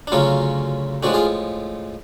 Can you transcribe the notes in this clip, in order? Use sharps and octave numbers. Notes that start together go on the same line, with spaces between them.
D4
D2 C#3 F#3 C#4 F4
A2 F3 G#3 D4 F#4
F4 G#4